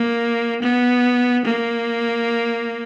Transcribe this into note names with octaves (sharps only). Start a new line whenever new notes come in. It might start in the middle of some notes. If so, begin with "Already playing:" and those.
Already playing: A#3
B3
A#3